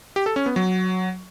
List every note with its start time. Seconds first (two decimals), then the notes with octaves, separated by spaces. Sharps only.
0.16 G4
0.26 A4
0.36 C#4
0.46 B3
0.56 F#3